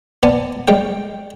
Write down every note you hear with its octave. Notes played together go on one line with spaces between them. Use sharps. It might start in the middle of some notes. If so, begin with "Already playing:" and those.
B3 D5 G#5 A5
G3 G#3 C#4 G5